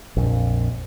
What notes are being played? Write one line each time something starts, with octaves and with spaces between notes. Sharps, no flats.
A#1 F2